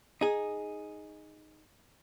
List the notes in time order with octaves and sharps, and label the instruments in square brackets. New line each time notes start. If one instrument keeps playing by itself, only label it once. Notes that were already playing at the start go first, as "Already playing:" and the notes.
[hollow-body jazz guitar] D#4 G#4